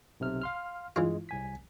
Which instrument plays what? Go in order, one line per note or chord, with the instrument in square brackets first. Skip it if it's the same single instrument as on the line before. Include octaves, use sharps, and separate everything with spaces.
[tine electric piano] B1 C3 F6
F5 C6 F6
[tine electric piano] G2 G#3 [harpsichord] E3 F4
[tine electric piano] C2 G#5 B6